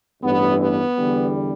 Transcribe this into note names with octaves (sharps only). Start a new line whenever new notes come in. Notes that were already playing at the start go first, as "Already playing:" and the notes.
A1 G2 E3 B3
B3
E2 D3 G3